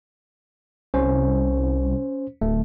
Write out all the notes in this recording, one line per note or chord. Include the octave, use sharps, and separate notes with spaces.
C2 C#4 C5
D1 A3